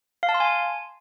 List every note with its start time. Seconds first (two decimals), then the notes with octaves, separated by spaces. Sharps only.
0.23 F5
0.29 A5
0.34 C6
0.40 G#5